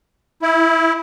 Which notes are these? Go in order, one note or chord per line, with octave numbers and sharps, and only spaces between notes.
E4